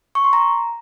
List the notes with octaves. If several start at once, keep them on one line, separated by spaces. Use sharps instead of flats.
C#6
C6
A#5